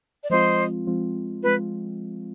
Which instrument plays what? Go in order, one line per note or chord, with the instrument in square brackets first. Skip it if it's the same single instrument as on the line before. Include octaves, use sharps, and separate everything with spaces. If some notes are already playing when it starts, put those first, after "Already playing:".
[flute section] D5
[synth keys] F3 G#3 C4 F4 [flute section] C5 D#5
[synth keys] F3 G#3 C4 F4
[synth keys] F3 G#3 C4 F4 [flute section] B4